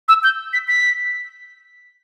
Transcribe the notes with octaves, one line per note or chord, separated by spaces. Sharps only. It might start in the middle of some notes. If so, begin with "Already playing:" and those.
E6
G6
B6
B6